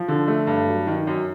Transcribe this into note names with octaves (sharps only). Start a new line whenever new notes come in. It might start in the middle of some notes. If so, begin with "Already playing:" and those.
Already playing: F3
D3
A3
G2
F#3
D#3
F#2